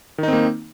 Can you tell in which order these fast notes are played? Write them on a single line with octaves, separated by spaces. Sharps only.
D#3 D#4 C4 A#3